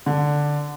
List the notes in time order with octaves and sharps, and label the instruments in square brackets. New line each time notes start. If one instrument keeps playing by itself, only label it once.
[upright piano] D3